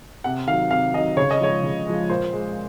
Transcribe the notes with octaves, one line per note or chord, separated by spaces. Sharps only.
C3 F#5
D#3 F#3 F5
C3 F5
D#3 F#3 D#5
C#3 C#5
D#5
F3 G#3 C#5
C#3
F3 G#3
A#2 C5
G#3